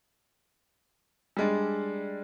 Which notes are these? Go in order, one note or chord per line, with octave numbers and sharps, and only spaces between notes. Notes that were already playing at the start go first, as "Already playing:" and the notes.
G3 G#3 D4